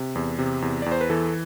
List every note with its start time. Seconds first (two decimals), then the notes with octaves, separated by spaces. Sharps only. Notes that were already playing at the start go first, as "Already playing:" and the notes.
Already playing: C3
0.15 E2
0.39 C3
0.62 E2
0.82 E2 D5
0.92 C5
1.01 B4
1.10 E3 A4